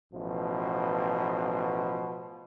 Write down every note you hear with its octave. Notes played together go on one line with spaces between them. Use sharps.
A1 B2 F3